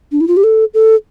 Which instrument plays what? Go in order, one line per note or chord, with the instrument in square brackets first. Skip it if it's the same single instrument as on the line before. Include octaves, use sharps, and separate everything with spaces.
[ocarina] D4
E4
F4
G4
A4
A4